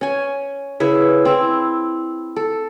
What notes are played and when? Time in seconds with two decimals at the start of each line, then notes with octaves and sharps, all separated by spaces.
0.01 C#4 G#5
0.80 C#3 E4 B4
1.25 C4 E4
2.36 A4